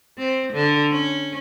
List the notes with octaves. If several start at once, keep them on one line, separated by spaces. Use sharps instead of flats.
C4
D3
C#4